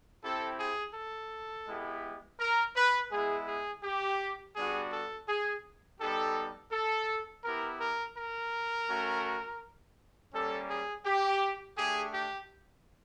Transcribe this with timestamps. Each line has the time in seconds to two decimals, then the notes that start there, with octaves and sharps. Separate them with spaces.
0.23 C4 E4 G4 A4
0.60 G#4
0.95 A4
1.67 G#3 B3 E4 G4
2.40 A#4
2.76 B4
3.11 G#3 B3 E4 G#4
3.47 G#4
3.84 G4
4.56 G3 B3 D4 F#4 G#4
4.92 A4
5.28 G#4
6.00 G3 B3 D#4 G4 A4
6.72 A4
7.44 B3 E4 G4 A#4
7.80 A#4
8.17 A#4
8.89 A3 C#4 F#4
10.33 G3 A#3 C#4 A4
10.70 G#4
11.06 G4
11.77 A3 D4 G4 G#4
12.14 G4